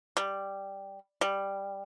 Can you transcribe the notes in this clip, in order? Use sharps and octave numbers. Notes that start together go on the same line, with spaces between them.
G3
G3